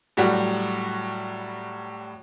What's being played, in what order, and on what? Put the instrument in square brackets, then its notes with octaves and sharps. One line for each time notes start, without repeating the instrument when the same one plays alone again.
[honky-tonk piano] A2 F#3 G3 F#4